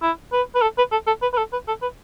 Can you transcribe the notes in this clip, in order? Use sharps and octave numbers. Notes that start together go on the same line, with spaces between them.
E4
B4
B4
A4
B4
A4
A4
B4
B4
A4
B4
A4
B4